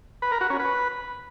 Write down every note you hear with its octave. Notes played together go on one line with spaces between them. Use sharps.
B4
A#4
F#4
C#4
B4